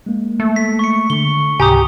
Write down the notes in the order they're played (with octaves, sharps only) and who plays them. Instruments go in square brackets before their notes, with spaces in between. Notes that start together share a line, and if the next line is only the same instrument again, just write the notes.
[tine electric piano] G#3 A#3
[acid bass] A3
[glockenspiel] B6
C#6 B6 C#7
[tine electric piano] D3 C#6 [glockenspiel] G7
[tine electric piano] C#2 G#2 C3 [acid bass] G4 [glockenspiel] G#5 A#5 D#6